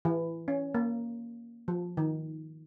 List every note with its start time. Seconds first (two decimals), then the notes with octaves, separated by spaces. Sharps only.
0.05 E3
0.48 C#4
0.74 A#3
1.68 F3
1.97 D#3